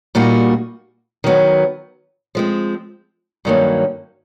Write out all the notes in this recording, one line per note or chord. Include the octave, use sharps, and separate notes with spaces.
A#2 G3 A#3 D#4 F#4
D#3 F#3 B3
F3 G#3 C4
G2 D#3 F#3 A#3 C#4